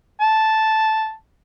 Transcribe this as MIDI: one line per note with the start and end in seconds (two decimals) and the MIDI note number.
0.21 1.13 81